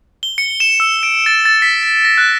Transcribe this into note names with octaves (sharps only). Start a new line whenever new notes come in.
G7
C#7
E7
E6
D7
A6
A6
B6
B6
A#6
F#6